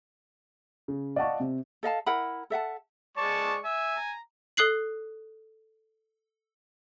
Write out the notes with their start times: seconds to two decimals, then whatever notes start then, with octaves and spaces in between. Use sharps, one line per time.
0.88 C#3
1.16 D5 D#5 F5 F#5 A5 C#6
1.40 C3 C4
1.83 A4 D#5 F5 A5
2.06 E4 A#4 F#5 B5
2.50 A4 E5 F#5 A5
3.17 G#3 D5 A5 C#6
3.65 E5 G#5
3.96 A#5
4.57 A4 D#6 F#6 C7 F#7